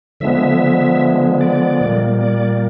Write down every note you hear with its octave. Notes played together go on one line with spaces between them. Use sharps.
D3 F3 G#3 B3 E5
D5
A#2 G3 A#3
D5